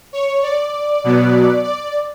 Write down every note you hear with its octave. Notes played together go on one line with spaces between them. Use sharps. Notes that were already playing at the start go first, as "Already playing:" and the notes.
C#5
D5
B2 F#3 B3
D5